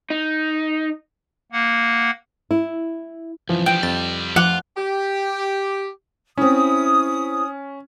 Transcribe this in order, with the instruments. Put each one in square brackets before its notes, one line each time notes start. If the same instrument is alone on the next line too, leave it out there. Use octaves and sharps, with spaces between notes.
[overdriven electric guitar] D#4
[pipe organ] A#3 F#5
[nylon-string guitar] E4
[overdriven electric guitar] C2 F#2 [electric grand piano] E3 F3
[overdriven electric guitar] G3 C4 [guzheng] G5
[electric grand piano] F2 [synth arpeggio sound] A6
[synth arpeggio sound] F3 D6 [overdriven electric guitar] F4 [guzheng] F#5
[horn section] G4
[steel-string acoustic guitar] C4 E4 [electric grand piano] C#4 [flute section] D#6